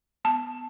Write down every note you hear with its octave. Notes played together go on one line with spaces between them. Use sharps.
B3 A5